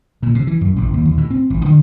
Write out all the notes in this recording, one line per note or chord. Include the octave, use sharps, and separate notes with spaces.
A#2
C3
E3
F#2
A1
D#2
D#2
A2
C4
A1
D3